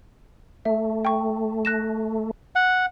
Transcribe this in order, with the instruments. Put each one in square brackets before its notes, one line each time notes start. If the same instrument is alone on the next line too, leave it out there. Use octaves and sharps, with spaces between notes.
[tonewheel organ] A3 [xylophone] E5
[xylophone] G5 C#6
F#6 A#6 E7
[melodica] F#5